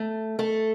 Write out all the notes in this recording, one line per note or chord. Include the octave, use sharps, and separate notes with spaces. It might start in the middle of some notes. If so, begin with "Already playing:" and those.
Already playing: A3
A3 A4